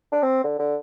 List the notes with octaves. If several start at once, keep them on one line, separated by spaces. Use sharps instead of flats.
D4
C4
D3
D3